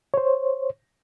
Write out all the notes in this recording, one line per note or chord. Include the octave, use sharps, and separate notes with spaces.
C5 C#5